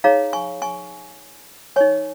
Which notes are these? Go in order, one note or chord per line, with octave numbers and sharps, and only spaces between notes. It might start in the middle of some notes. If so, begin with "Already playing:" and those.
D#4 G#4 C#5 F5 A#5
G#5 C#6
G#5 C#6
D#4 C#5 G#5 C#6